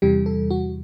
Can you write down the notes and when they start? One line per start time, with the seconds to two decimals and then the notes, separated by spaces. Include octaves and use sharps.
0.02 E2 C3 E3 G3 G4
0.26 A4
0.50 F#4